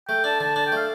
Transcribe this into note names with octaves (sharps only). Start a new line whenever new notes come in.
A3 G5
D4 A5
D3 A5
D4 A5
G5
A3 F5